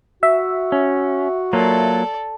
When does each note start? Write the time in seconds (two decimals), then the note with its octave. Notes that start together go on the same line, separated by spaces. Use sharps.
0.23 F#4 E5
0.72 C#4
1.53 F#3 A#3 F4 A4 D5